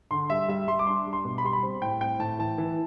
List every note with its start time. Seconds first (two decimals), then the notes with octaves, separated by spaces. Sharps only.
0.11 D3 C6
0.30 G3 E5
0.48 G3 E5
0.68 G3 C6
0.79 D6
0.87 D4 C6
1.07 G3
1.13 C6
1.25 B2
1.38 B5
1.44 G3 C6
1.53 B5
1.63 C4
1.82 A2 G5
2.00 C4 G5
2.19 A2 A5
2.39 E3 A5
2.58 E3